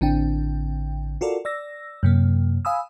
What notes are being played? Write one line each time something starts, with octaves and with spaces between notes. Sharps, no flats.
A1 D3 C4 D4 G5
F4 F#4 A4 A#4 D5
D5 E6 A#6
F#2 C3 A#3
F5 G#5 B5 D#6 E6